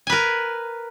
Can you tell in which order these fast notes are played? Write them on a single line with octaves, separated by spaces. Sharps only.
G#5 B4 A#4